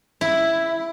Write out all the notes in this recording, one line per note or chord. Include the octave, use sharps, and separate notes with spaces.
E4